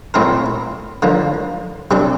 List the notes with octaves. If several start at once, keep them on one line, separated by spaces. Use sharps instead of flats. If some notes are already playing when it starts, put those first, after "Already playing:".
A#2 A3 C4 E4 A#4
D3 F3 A#3
C3 G3 D4 A4